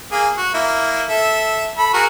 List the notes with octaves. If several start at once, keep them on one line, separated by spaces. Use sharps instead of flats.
A#3 G#4
F#4
A#3 E4
A4 E5
A4 B5
F#4 G#4 A#4